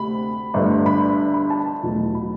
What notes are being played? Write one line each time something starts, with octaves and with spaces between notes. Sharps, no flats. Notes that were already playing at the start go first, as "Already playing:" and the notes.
Already playing: D2 C3 B5
G1 G2 D3 A3
B5
B5
A5
E2 B2 F#3 A3
B5